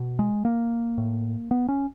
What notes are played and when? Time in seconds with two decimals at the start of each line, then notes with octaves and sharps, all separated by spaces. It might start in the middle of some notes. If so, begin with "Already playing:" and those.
Already playing: B2
0.19 G#3
0.45 A#3
0.98 A2
1.51 B3
1.68 C#4